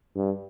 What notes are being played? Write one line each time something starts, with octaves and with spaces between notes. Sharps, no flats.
G2